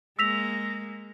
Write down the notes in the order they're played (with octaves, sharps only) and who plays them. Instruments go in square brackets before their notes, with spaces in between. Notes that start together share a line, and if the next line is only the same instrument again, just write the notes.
[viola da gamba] G#3 A#3 [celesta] E6 B6 F7 [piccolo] A#6